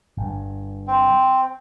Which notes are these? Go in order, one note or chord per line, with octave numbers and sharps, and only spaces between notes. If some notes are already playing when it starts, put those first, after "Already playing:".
G1 G2
C4